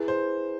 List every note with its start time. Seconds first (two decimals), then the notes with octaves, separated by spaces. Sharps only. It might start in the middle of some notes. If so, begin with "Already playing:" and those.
Already playing: E4 G#4 B4
0.08 C5